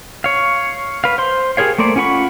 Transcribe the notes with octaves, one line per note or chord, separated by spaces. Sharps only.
C#5 F5
B4 F5
C5 C6
G4 G#4 A#4 C#5 F5
A3 A#3 C5 D5
C#4 F4 F#5 B5 C#6